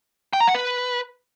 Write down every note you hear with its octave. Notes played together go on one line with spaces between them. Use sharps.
G5
A#5
F#5
B4